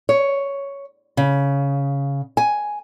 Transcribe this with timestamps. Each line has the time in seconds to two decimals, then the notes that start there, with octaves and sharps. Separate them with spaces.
0.09 C#5
1.17 C#3
2.37 G#5